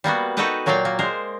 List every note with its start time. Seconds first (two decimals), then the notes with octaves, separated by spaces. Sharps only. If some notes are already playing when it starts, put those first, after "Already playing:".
0.04 G3 A#3 B3 F#4
0.37 D#4 F#4 A4 B4 D#5 G5
0.66 A#2 F#3 A#3 D5 F5 G5
0.85 A#3
0.99 G#3 A#4 C5